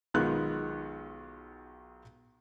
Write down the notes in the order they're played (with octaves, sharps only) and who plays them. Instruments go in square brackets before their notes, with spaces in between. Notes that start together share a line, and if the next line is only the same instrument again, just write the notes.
[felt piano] B1 D#3 G#3 B3 F4 F#6